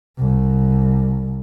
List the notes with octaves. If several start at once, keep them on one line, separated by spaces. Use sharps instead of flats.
C2